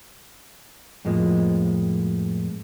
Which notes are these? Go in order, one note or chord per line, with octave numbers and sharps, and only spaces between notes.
F2 A2 F3 G#3 A#3